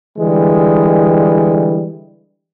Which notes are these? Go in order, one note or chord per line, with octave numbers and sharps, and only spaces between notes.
D3 E3 G3 G#3